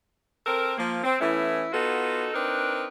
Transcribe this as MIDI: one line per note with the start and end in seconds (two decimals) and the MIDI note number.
0.46 0.73 60
0.46 0.73 69
0.46 0.73 70
0.78 1.00 53
0.78 1.00 58
1.04 1.17 60
1.21 1.68 52
1.21 1.68 57
1.21 1.68 59
1.21 1.68 61
1.21 1.68 64
1.73 2.29 59
1.73 2.29 63
1.73 2.29 65
1.73 2.29 66
1.73 2.29 69
2.34 2.86 60
2.34 2.86 62
2.34 2.86 63
2.34 2.86 70
2.34 2.86 71